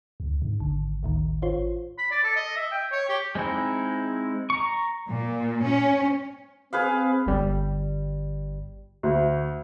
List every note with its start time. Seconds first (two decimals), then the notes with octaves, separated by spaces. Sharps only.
0.20 D2
0.42 G#2
0.60 G#1 D3
1.03 D2 A2 D#3
1.42 F4 C5 C#5
1.98 B5
2.11 D5
2.24 A4
2.36 D#5
2.56 E5
2.72 G5
2.92 C#5
3.09 G4
3.35 G#3 C4 D#4 E4
4.50 A#5 C#6
5.09 A#2
5.64 C#4
6.73 C4 G#4 B4 F5
7.26 G1 G3
9.03 D2